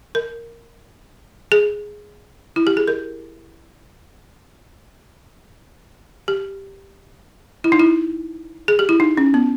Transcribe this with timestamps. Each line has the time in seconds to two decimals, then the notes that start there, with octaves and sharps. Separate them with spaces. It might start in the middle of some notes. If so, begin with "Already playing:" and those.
0.15 A#4
1.52 G#4
2.56 E4
2.67 G4
2.77 G#4
2.88 A#4
6.28 G4
7.64 E4
7.72 D#4
7.80 E4
8.68 G#4
8.79 G4
8.89 E4
9.00 D#4
9.17 C#4
9.34 B3